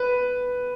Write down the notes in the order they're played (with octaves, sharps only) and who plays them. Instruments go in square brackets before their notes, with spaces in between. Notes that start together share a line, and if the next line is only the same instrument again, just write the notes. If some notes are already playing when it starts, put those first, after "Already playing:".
Already playing: [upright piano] B4